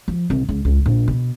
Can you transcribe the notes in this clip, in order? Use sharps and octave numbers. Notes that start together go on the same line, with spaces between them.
F3
C2
C#2
C#2
A#1
B2